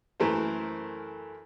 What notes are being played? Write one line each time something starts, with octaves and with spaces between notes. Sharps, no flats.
F#2 E3 A3 A#4 C5